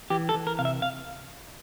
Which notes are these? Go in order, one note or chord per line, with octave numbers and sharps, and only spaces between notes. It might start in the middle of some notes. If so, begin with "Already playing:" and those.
E3 G4
A4
E3
A#4
C3 F5
E5
F5